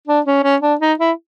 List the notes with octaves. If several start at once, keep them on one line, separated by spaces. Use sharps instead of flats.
D4
C#4
C#4
D4
D#4
E4